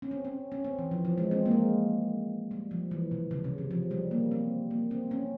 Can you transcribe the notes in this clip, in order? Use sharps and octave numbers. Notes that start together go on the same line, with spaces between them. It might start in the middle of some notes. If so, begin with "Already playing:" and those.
C#4
C4
C#4
C#4
C4
E3
F3
F3
G#3
C4
A#3
G#3
G3
F3
E3
C3
C#3
C3
C#3
F3
G3
A#3
C4
A#3
C4
C#4